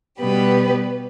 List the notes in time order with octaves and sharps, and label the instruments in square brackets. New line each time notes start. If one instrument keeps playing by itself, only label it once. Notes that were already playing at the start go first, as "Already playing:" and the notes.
[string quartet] B2 G3 B3 G4 B4